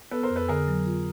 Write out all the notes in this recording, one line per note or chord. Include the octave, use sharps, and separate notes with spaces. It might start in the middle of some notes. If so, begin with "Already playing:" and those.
B3 A4 B4
A#4 C5
F2
A4 B4
D3 G#4 A#4
F#3
F4